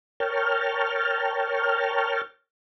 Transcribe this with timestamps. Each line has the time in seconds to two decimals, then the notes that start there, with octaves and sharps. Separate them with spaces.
0.20 A#4 C#5 G5 A5 F6